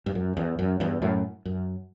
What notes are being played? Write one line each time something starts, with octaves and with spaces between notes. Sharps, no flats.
G2
F#2
E2
F#2
E2 G2
F#2 A2
F#2